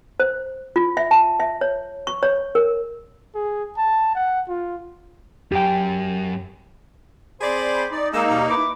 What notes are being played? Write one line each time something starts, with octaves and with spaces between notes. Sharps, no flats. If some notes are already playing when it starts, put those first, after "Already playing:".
C5
F4
E5
A5
E5
C#5
C#6
C#5
A#4
G#4
A5
F#5
F4
F#2 G4 G5
C4 G#4 C5 D5 B5
D#4 D5
G#3 A#3 D#4 E6
D#2 B2 G3
E4 B4 D6